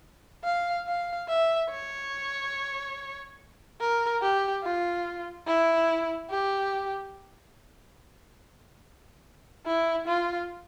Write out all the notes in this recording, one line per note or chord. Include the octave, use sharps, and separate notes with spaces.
F5
F5
E5
C#5
A#4
G4
F4
E4
G4
E4
F4